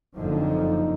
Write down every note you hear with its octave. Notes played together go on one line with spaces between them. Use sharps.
F#1 F2 D3 F3 D#4